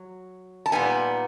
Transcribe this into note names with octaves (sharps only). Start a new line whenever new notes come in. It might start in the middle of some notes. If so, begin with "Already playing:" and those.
Already playing: F#3
A5
A#2 G3 B3 D#4 G#5